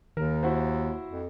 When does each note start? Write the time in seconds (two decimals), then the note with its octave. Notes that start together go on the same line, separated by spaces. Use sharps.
0.17 D#2 D#3 A#4
0.43 E4 F#4 C5
1.10 F2